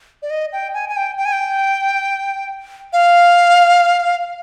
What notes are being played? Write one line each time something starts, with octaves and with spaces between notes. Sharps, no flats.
D5
D#5
G5
G#5
G#5
G5
G5
G#5
G5
F5